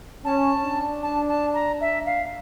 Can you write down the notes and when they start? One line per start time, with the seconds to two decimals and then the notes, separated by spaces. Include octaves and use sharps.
0.25 C#4 A5
0.64 D4
1.03 A5
1.29 A5
1.54 A#5
1.81 E5
2.06 F5